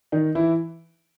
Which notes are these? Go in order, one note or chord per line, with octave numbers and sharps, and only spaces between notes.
D#3 D#4
E3 E4